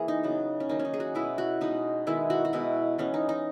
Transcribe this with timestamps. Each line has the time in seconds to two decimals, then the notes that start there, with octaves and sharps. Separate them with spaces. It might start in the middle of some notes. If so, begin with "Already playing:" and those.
Already playing: E3 A#3 G#4
0.08 D#4
0.23 C#3 F#3 B3
0.60 C#4
0.69 D#3 F#3 A#3 D#4
0.79 C#4
0.85 D#4
0.94 G#4
1.00 F#4
1.15 B2 G#3 B3 E4
1.38 F#4
1.61 B2 G#3 B3 D#4
2.07 D#3 G#3 B3 E4
2.30 F#4
2.45 F#4
2.53 B2 G#3 B3 E4
2.98 E3 G#3 B3 C#4
3.14 D#4
3.29 D#4